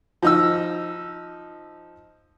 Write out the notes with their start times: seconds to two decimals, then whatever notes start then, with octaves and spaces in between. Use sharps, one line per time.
0.22 F3 D#4 E6